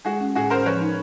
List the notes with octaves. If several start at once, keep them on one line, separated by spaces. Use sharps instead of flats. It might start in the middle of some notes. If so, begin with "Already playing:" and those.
G#3 F#4 G#4
C#4
A2 F#4 G#4
C#4 A#4 C5
F3 B4 C#5
D#4